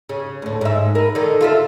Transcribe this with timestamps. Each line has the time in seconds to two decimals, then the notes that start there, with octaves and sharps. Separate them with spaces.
0.09 C#3
0.42 D2 A2
0.61 G#2 E5
0.95 A#4 B4
1.15 D3 D#3
1.41 F4 A4 E5